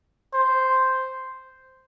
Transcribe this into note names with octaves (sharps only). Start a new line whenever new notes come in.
C5